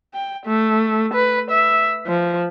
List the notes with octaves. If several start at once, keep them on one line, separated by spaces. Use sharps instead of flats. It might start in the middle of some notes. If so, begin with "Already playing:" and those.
G5
A3
B4
E5
F3